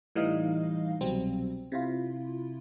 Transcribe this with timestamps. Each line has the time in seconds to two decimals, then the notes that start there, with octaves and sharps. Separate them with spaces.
0.15 A2 E3 G3 D#4 D#5 F5
1.01 C2 B2 F#3 G3 C4
1.72 C3 E4 F4